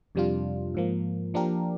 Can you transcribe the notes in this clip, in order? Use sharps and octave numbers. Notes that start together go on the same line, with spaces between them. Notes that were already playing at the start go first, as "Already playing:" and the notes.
F2 C3 G3 D4 F4
G#2 F3 A#3
F3 A#3 D4 G4 A#4